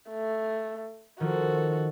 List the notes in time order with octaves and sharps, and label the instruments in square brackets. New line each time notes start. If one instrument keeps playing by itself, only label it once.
[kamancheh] A3
[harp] D#3 F3 F4 [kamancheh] F#4 A4